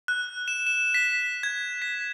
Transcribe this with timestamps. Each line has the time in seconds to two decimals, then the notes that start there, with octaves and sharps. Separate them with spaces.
0.08 F#6
0.48 E7
0.67 E7
0.94 B6
1.43 G#6
1.82 B6